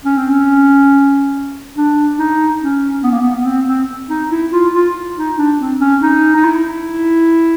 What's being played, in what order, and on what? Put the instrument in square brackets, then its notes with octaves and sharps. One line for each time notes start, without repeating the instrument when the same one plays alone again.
[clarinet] C#4
C4
C#4
D4
D#4
C#4
B3
A#3
B3
B3
C4
C4
D#4
E4
F4
F4
D#4
D4
C4
C#4
D#4
D#4
E4